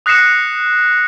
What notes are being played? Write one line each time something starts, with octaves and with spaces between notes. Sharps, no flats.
D#6 F#6 A#6 C7 C#7 E7